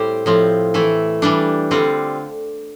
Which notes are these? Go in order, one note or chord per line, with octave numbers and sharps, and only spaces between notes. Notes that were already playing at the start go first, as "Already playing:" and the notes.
Already playing: A2 G3 C4 G4 A4 C5
A2 F3 C4
E3 A3 E4
E3 G3 D4
D3 G3 C4 F4